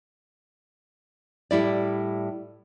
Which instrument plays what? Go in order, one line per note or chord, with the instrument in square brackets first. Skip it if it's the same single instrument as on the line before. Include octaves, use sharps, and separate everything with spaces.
[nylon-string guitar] A2 G3 E4 D5